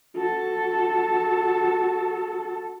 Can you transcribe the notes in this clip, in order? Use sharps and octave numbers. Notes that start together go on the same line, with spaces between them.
F#4 A4